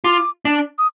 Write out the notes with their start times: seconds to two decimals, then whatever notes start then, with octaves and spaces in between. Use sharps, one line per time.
0.04 F4 D6
0.45 D4
0.78 D#6